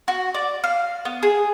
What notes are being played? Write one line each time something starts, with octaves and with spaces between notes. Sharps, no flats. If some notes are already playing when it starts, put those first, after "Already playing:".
F#4
D5
F5
B3
G#4